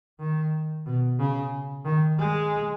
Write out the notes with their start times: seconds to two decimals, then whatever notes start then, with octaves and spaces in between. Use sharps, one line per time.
0.19 D#3
0.86 B2
1.19 C#3
1.85 D#3
2.19 G#3